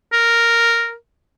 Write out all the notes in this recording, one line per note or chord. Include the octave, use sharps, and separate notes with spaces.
A#4